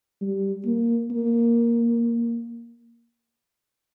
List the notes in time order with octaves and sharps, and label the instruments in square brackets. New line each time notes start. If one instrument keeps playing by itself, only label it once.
[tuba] G3
A#3
A#3